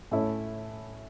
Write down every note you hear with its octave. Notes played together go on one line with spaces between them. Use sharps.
A2 A3 C#4 E4